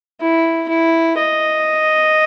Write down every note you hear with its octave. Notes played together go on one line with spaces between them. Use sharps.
E4
E4
D#5